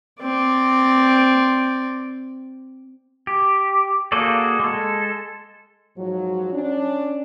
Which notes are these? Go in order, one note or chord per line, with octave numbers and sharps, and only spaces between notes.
C4 D5
G4
A#3 F#4 G#4 A4 D5
G#3 A4
G#2 F3 F#3
C#4 D4